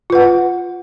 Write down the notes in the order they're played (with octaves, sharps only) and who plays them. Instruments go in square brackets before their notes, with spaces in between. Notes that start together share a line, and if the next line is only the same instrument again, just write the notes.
[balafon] F4
B4
F#5